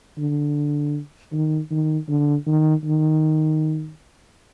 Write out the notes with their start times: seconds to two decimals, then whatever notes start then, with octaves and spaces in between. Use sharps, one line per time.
0.18 D3
1.33 D#3
1.71 D#3
2.09 D3
2.47 D#3
2.85 D#3